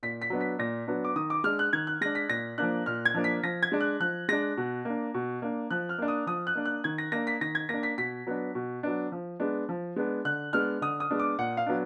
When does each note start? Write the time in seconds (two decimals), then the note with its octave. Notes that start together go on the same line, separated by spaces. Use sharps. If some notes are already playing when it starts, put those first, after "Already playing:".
0.03 A#2 B6
0.22 B6
0.30 F#3 B3 D4
0.41 B6
0.59 A#2 A#6
0.87 F#3 B3 D4
1.05 D6
1.16 D#3 D#6
1.30 D6
1.44 G#3 D4 F6
1.59 F#6
1.73 D#3 G#6
1.87 F#6
2.01 G#3 D4 A#6
2.15 B6
2.29 A#2 A#6
2.58 F3 A#3 D4 F#6
2.86 A#2 F6
3.05 G#6
3.15 F3 A#3 D4
3.24 B6
3.43 F3 A#6
3.63 G#6
3.72 G#3 D4
3.81 F#6
4.00 F3 F#6
4.29 G#3 D4 A#6
4.57 B2
4.85 A#3 D4
5.14 B2
5.42 A#3 D4
5.71 F3 F#6
5.89 F6
5.98 A#3 D4
6.08 D#6
6.27 F3 D#6
6.47 F#6
6.55 A#3 D4
6.66 F#6
6.84 D#3 G#6
6.98 A#6
7.12 A#3 D4 A#6
7.27 B6
7.41 D#3 A#6
7.55 G#6
7.69 A#3 D4 A#6
7.83 B6
7.98 B2 B6
8.27 F#3 B3 D4
8.55 B2
8.83 F#3 B3 D4
9.12 F3
9.40 G#3 B3 D4
9.69 F3
9.96 G#3 B3 D4
10.25 D3 F#6
10.53 G#3 B3 D4 F6
10.81 D3 D#6
11.00 D#6
11.11 G#3 B3 D4
11.19 D6
11.38 A#2 F#5
11.57 F5
11.66 F#3 B3 D4